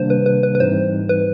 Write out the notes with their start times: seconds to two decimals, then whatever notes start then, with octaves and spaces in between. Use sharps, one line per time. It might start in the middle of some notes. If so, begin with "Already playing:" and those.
Already playing: C3 D#3 G3 A#3 D4 C5
0.10 B4
0.26 B4
0.43 B4
0.55 B4
0.60 G#2 E3 G3 C4 D#4 C5
1.09 B4